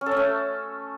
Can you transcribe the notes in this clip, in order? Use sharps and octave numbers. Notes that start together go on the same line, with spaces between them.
C#4
A4
C#4
A3